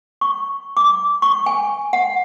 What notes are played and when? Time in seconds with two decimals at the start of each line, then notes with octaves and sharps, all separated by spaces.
0.21 C#6
0.77 D6
1.22 C#6
1.46 G#5
1.93 F#5